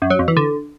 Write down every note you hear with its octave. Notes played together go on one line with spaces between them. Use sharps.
F#2
F#3
F2
E3
D3